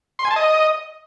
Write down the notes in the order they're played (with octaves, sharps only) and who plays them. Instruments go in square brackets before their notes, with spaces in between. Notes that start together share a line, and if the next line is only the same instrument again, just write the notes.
[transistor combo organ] C6
G#5
A5
D#5